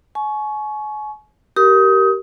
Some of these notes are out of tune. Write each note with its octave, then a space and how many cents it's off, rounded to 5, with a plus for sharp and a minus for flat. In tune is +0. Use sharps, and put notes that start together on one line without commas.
G#5 +35 C#6 +0
G4 -25 A#4 +0 D#6 +25